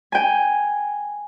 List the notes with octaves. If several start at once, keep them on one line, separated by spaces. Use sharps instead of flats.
G5 G#5